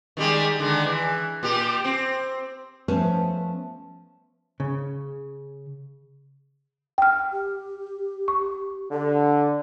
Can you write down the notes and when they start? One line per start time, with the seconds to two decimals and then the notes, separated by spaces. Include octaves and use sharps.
0.17 D#3 G3 G#3
0.59 D3 D#3 G#3
0.85 E3
1.43 A#2 G4
1.84 C4
2.88 F3 A3 B3 C#4 C5 A5
4.60 C#3
6.98 G5 F6
7.32 G4
8.28 C#6
8.91 D3 A4